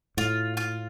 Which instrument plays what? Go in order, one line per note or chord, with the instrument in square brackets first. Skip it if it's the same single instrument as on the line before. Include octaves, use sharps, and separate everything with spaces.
[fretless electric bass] A2 [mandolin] F4
[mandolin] F4